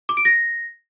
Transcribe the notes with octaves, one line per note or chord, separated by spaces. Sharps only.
D6
D7
A#6